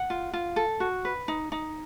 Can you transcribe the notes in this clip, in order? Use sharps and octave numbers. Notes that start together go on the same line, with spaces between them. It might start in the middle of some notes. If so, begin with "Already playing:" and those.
Already playing: F#5
F4
F4
A4
F#4
B4
D#4
D#4